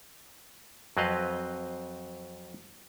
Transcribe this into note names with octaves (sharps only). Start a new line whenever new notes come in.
F2 F#3 C4 B4 D#5 F5